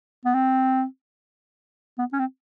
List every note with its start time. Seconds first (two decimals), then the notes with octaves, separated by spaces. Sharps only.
0.25 B3
0.35 C4
1.98 B3
2.13 C#4
2.19 C4